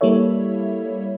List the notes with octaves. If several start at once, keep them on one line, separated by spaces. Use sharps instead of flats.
G3 A#3 E4 A4 C#5 E5